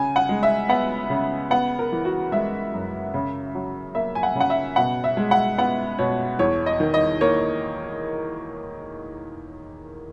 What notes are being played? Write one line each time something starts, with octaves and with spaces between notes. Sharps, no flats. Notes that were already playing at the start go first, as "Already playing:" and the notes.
Already playing: C#3 G#5
F#5
G#3
E5
B3 F#5
C#3
B3 F#5
A#4
E3
F#4
G#3 E5
F#2
C#3
F#3
A#3 E5
G#5
F#5
C#3
F#5
E5
B2 F#5
E5
G#3
F#5
B3 F#5
B2 C#5
E2 C#5
D#5
D#3
D#5
A#3 C#5